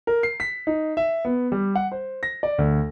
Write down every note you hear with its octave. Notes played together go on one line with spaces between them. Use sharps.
A#4
C7
B6
D#4
E5
B3
G3
F#5
C5
A#6
D5
D2